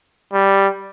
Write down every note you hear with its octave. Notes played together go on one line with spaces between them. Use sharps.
G3